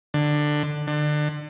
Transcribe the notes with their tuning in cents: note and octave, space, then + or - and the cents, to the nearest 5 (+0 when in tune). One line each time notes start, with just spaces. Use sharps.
D3 +15
D3 +30